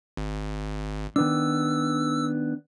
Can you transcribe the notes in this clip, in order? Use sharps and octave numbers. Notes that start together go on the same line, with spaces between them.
G#1
D#3 B3 D4 E6